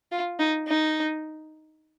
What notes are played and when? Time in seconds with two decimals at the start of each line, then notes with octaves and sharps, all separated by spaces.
0.12 F4
0.39 D#4
0.68 D#4